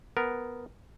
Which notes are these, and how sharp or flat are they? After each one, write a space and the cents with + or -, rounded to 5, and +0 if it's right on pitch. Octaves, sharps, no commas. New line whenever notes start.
B3 +0 A#4 +0